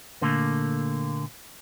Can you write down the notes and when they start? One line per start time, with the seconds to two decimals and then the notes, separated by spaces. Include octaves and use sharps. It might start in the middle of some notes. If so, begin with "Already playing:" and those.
0.22 A#2 D3 A3 A#3